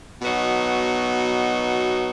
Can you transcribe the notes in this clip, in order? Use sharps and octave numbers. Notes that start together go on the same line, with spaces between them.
B2 F#3 B3 D#4 F#4